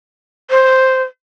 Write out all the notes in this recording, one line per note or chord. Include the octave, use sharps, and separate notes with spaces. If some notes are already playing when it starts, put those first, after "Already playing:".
C5